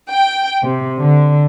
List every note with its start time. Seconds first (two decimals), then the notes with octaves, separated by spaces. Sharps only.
0.10 G5
0.63 C3
1.01 D3